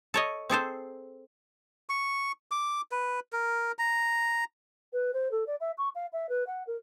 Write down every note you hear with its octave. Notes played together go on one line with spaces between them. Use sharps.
A4 C#5 D#5
C4 G#4 A4 C5
C#6
D6
B4
A#4
A#5
B4
C5
A4
D5
E5
C#6
F5
E5
B4
F#5
A#4